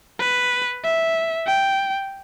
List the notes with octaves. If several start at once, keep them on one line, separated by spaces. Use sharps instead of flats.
B4
E5
G5